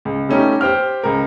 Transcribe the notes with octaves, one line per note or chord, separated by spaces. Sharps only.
C#2
G3 A3 C#4 D#4 G4
G4 C5 G5 F6
C#2 A#4